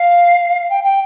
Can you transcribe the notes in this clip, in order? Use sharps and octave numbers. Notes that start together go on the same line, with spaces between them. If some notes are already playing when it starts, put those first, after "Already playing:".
Already playing: F5
G5
G5